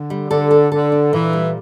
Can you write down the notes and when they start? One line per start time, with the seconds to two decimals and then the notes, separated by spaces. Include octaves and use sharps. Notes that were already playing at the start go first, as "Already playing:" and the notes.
Already playing: D3
0.10 G3
0.30 D3 A4
0.51 A4
0.72 D3 A4
0.92 D4
1.13 A#2 E3
1.33 G3